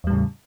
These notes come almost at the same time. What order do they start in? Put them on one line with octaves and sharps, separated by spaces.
E2 G3 A2 C#3